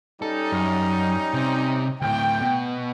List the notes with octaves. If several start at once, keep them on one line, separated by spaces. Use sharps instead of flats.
G3 C#4 D#4 A4
F#2
C3
D2 A2 G5
B2